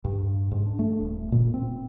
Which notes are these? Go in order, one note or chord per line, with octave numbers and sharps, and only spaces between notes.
G2
G#2
D4
A3
D#1
A#2
C4